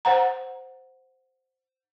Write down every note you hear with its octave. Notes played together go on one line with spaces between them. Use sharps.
C5 F#5 A#5